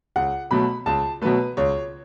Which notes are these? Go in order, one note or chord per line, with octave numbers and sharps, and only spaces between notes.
C#2 F#5
B2 F#3 A3 B5
C#2 A5
B2 F#3 A3 B4
C#2 C#5